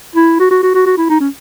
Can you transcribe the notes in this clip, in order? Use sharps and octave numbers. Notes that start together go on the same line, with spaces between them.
E4
F#4
F#4
F#4
F#4
F#4
E4
D#4
C#4